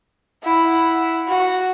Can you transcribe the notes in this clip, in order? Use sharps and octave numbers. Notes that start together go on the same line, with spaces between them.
E4 F#5
F#4